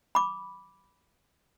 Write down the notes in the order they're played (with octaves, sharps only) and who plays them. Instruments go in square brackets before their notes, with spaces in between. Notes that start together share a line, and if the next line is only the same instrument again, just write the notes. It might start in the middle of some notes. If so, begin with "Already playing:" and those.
[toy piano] B5 D6